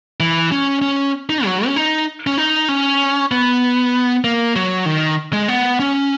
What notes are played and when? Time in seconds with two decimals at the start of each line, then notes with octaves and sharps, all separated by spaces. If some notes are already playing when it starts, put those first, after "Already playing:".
0.20 E3
0.52 C#4
0.82 C#4
1.29 D#4
1.45 F#3
1.66 C#4
1.76 D#4
2.27 C#4
2.38 D#4
2.68 C#4
3.31 B3
4.24 A#3
4.56 F#3
4.86 D#3
5.33 G#3
5.48 B3
5.80 C#4